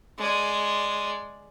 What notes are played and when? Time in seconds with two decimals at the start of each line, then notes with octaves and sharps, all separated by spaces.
0.19 G#3 D5